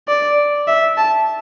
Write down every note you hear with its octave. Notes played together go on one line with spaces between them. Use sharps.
D5
E5
A5